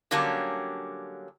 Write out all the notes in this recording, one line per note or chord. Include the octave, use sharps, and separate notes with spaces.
D3 F#3 G3 A#3 C#4 D4